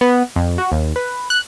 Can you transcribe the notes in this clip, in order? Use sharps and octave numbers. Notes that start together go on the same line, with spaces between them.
B3
F2
F#4
D#2
B4
F#6